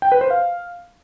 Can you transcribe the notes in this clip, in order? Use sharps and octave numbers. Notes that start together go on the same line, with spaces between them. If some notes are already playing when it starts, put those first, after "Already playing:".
G5
B4
C5
F5